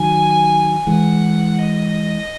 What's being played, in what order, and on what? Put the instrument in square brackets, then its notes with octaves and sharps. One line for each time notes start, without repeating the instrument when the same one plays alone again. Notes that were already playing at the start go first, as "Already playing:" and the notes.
Already playing: [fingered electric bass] D#3 F#3 [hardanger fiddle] G#5
[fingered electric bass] E3 G#3 [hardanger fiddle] F#5
[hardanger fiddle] D#5